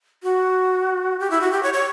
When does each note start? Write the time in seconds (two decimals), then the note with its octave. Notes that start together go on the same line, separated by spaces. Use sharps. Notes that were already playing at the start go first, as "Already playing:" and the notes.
0.23 F#4
1.19 G4
1.30 E4
1.41 F#4
1.52 G4
1.63 C#5
1.74 C#5